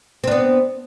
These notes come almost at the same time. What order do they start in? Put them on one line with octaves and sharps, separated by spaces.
C4 D4 B3